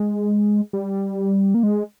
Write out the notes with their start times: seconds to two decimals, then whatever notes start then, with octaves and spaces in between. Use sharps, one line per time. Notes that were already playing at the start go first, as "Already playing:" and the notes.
Already playing: G#3
0.73 G3
1.54 A#3
1.63 G#3